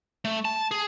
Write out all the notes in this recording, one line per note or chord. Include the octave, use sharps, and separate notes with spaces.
A3
A5
G#4